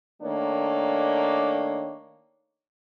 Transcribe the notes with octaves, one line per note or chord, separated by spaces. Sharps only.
D#3 A3 A#3 D4 C#5